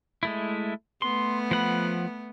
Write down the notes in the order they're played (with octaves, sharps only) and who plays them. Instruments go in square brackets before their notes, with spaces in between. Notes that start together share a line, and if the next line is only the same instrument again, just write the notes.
[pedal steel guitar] G#3 A3 E4
[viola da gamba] A3 B3 [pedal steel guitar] C6
[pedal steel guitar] F3 F#5 B5